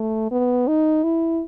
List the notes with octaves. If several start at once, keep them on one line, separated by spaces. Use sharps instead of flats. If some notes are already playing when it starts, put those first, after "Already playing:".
Already playing: A3
B3
D#4
E4